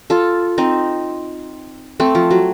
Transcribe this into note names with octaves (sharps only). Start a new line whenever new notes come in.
F4 A4
C4 D#4
A3 C4
F3
F#3